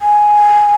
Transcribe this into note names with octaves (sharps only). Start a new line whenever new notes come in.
G#5